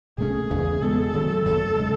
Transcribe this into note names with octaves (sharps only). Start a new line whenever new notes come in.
B2 A3 C#4 G#4
E2 C#3 E3 A3
B2 G#3 B3 A4
F#2 D#3 F#3 A3
F#2 D#3 A3 A4
C#3 G#3